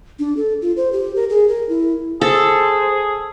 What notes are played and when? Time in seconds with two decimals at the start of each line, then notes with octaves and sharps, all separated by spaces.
0.19 D4
0.37 A4
0.62 F4
0.77 C5
0.92 G4
1.16 A#4
1.30 G#4
1.49 A#4
1.69 E4
2.21 G#4 A4 C5